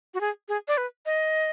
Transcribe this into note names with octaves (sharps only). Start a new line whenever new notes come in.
F#4
G#4
G#4
D5
B4
D#5